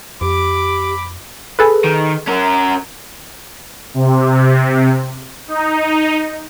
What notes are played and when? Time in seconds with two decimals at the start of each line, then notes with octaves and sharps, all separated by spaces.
0.21 F2 G4 B5 D6
1.59 G#4 A4 B4
1.84 D#3
2.28 C#4 A#4
3.94 C3
5.48 D#4